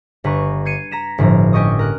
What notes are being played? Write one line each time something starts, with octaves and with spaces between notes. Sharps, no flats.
G1 B4 A#5 C#6
G#6 C7 C#7 D#7
A#5 A#6 B6 E7
G1 A2 F3 A#5
C#4 G4 D#5 C#6 D#6
A#4 F#6